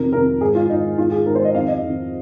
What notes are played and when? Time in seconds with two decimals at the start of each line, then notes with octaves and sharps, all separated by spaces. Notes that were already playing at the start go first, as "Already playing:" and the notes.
Already playing: F2 C3 D#3 A#4
0.13 F2 C3 D#3 A#4
0.41 G#2 D#3 G#4
0.55 F4
0.69 G#2 D#3 D#4
0.98 G#2 D#3 F4
1.11 G#4
1.26 G#2 D#3 A#4
1.35 C5
1.45 D#5
1.54 F2 D#3 F5
1.68 D#5
1.83 F2 D#3